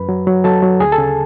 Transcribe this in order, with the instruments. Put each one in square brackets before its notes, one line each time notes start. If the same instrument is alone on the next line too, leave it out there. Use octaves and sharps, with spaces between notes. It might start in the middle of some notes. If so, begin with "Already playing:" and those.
Already playing: [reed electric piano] F#2 B4 B5
F#3
F#3
F#3 A4 A5
F#3
D2 G#4 G#5
A4 A5
C#3